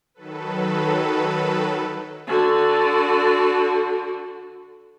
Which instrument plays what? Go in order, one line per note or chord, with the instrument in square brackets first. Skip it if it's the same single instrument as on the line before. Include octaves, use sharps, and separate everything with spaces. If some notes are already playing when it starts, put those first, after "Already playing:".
[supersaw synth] D#3 F#3 A4 B4
[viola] D3 F#4